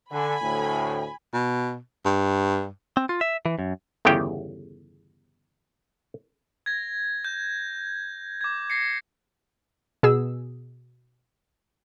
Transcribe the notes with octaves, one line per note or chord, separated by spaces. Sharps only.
D3 G#5 B5
D2 A2
B2
G2
C4
F4
E5
E3
F#2
G1 E2 C#3 G4 G5
G#6 A#6
G6
D6 G#6
A#6 C7 C#7
B2 G#4 E6